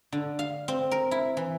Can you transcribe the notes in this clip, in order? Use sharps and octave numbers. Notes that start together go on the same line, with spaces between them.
D3
F5
C4
A#4
E4
E3